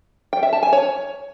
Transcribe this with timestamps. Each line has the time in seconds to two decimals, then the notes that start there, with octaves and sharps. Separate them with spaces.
0.33 G5
0.43 E5
0.53 A5
0.63 G#5
0.73 C#5